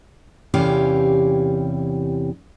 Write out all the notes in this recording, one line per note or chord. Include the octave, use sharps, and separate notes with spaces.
E2 C3 E3 C#4 G4 F5